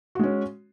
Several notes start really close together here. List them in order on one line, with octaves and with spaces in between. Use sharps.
F#4 G#3 C#4